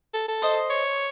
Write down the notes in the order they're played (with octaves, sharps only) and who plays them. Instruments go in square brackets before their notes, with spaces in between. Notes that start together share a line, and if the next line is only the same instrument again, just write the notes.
[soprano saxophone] A4
A4
[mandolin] C5 D#5
[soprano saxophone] C#5